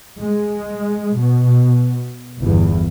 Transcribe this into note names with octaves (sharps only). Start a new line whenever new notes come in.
G#3
B2
G1 E2